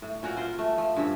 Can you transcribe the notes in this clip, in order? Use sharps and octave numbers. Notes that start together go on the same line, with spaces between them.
A2
A#2 C#4 F#4 A#4
F4 A#4 C5
A3
F3 A3
G2 C#3 F3 E5